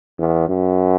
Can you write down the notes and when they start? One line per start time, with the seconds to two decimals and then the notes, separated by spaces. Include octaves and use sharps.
0.20 E2
0.49 F#2